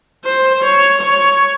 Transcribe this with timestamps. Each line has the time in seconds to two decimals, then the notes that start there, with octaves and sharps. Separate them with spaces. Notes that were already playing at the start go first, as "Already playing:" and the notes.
0.25 C5
0.63 C#5
1.02 C#5